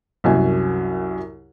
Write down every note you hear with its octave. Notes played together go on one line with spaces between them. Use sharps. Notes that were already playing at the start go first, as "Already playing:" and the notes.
C2 F#2 G#5